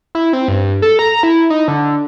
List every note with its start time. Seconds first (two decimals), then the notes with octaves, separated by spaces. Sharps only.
0.15 E4
0.33 C4
0.48 G2
0.82 A4
0.99 A#5
1.23 E4
1.50 D#4
1.68 D3